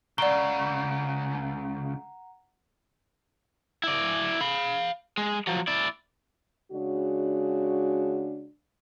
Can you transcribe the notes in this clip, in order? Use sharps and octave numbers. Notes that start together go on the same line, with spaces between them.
C#2 C#3 D5 F#5 A#5 G7
E4 D5
F5 B5
G#3
F3 F#3
E4 D5
C#3 G#3 D4 F#4